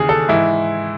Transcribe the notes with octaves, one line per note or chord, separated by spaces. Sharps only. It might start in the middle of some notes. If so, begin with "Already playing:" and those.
Already playing: D#2 C#3 E3 G#4
A4
G#2 E3 E4